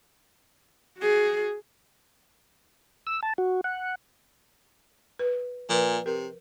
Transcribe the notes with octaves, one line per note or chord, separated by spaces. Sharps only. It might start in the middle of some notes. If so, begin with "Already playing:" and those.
F#4 G#4
E6
A5
F#4
F#5
B4
A#2 F3 B4
C3 A#4